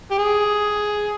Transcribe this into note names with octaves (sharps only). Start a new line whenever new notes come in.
G4
G#4